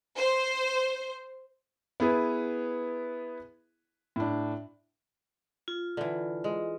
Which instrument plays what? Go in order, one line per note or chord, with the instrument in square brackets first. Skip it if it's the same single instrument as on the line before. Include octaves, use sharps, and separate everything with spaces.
[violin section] C5
[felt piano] B3 E4 G#4 B4
A2 D4
[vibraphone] F4
[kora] D3 E3
G#3